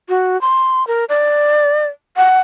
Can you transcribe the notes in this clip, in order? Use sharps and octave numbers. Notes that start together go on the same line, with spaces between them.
F#4
C6
A#4
D5
F#5